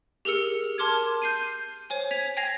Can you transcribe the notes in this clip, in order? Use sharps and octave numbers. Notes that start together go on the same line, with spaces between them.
G4 G#4 A#4 E6 C#7
A#4 A5 C6 D6 F6 G#6
G6 C7 D#7
C5 C#5 G#5
G#6 B6 F7
G5 G#5 G#6 A#6 C7 F7